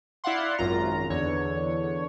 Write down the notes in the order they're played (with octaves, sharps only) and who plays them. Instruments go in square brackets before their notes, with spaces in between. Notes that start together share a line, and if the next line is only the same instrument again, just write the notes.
[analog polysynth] E4 D5 F5 F#5 C6
G#1 F#2 F4 A#5
E2 D3 C#5